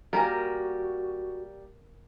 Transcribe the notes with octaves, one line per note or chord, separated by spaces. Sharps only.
G3 A#3 F#4 A#4 D#5 F5 G#5 A#5